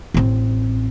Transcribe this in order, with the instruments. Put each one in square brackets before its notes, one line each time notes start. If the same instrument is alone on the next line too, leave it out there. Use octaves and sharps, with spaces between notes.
[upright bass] A1 C4